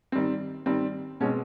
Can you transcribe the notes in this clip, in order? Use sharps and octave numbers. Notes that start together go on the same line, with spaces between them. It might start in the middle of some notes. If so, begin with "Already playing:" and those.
D#3 G3 C4
D#3 G3 C4
B2 G#3 C4 C#4